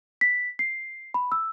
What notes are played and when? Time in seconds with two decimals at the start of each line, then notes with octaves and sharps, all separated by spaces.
0.21 B6
0.59 C7
1.14 B5
1.32 E6